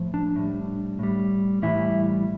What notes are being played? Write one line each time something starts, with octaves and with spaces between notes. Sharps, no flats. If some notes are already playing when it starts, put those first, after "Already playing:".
Already playing: A2 F3
D4
A2 G3
A2 G3
A2 E3 G3 E4